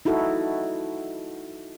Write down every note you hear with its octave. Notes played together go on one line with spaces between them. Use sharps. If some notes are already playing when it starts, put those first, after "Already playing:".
D#4 E4 F#4 A4